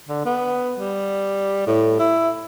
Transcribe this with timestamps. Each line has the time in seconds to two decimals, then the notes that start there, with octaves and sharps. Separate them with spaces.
0.09 D3
0.26 B3
0.79 G3
1.67 A2
2.00 E4